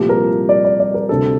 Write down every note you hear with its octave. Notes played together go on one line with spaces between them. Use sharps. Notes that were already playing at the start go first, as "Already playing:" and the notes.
Already playing: C2 A#2 F3 A3 G4
A#4
D5
D5
D5
A#4
D2 C3 G3 D4 A4